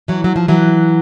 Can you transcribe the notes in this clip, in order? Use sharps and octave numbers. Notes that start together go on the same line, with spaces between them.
E3 F#3
F#3
F3
E3 F#3